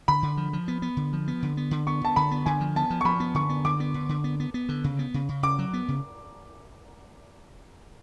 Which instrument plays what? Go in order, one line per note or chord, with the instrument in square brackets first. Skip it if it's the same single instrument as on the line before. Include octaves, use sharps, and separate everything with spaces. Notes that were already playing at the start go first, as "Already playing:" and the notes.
[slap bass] D3 [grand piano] B5
[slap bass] D3
F3
F3
B3
B3
D3
F3
B3
D3
B3
D3
[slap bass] B3 [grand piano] C#6
[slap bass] D3 [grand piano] A5
[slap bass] D3 [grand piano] B5
[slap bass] B3
[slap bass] D3 [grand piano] G#5
[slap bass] F3
[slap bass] B3 [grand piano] A5
[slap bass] F3
[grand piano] C#6
[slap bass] F3 [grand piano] B5
[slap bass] B3
[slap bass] D3 [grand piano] C#6
[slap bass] B3
[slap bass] D3 [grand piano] D6
[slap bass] B3
D3
D3
B3
B3
B3
D3
C#3
B3
C#3
C#3
[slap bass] C#3 [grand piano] D6
[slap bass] F#3
B3
C#3